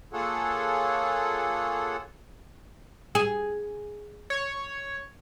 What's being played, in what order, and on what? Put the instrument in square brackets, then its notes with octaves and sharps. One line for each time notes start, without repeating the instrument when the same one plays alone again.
[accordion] A#3 F4 G#4 A4 C#5 F#5
[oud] G#4
[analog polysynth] C#5